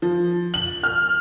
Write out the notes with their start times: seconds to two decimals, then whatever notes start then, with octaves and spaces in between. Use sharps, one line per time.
0.02 F3
0.54 F#7
0.83 F6